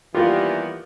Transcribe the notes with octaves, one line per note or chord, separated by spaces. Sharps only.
D#2 E3 G3 B3 F4 G4 A#4 D5